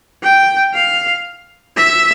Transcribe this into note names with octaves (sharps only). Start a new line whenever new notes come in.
G5
F5
E5